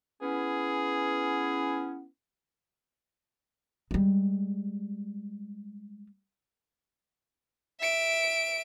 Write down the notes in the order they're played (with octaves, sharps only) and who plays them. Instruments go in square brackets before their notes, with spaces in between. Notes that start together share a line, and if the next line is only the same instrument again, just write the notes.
[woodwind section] B3 C#4 E4 [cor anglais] G#4
[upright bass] G3 G#3
[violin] E5 D7